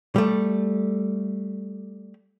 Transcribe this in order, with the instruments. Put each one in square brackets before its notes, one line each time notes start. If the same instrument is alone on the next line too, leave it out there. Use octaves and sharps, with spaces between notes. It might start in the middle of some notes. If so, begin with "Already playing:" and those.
[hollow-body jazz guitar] G3 A3